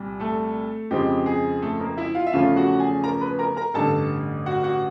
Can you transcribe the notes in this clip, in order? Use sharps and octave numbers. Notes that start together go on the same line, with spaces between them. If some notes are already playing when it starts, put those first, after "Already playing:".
Already playing: C2 A#2 G3
A3 A4
F2 C#3 F3 G#3 C4 G4
G#4
A3 A4
A#3 A#4
E4 E5
F4 F5
E5
E2 C#3 F3 A3 C#4 F4 F5
F#4 F#5
G#4 G#5
A#4 A#5
B4 B5
A#4 A#5
A#4 A#5
A1 G2 D3 A4 A5
F#4 F#5
F#4 F#5